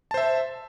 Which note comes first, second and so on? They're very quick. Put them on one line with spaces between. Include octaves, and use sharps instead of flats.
A5 C5 E5